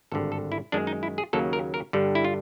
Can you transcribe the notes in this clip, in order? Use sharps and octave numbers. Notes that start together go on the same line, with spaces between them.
G#1 G2 D3 A4
A4
E4
F#2 D#3 G#3 D4
D#4
E4
G#4
D#2 C#3 F#3 A#3 A4
A#4
A#4
G2 D3 G3
E4
F4